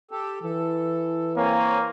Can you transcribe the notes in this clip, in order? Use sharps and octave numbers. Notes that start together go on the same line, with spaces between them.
G4 A4
E3 A4
A#3 C4 C#5 G#5